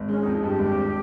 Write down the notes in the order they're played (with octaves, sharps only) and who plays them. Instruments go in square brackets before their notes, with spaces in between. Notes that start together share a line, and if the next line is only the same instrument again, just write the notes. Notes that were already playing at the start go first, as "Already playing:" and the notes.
Already playing: [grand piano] G#1
[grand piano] G#3 [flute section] C#4
[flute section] D#4
[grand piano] F2
[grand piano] G2 [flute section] G4
[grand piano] G#1
F2